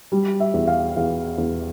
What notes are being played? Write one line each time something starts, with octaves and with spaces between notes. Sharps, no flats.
G3
E5
E2
F5
E2 F5
E2